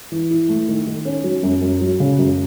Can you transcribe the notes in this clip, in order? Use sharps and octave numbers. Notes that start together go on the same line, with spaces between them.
E3
E4
A3
D#3
D#3
C#4
F#3
F#2
F#2
F#3
C#3
F#2